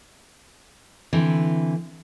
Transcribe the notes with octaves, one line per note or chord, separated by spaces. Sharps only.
D3 E3 C4 B4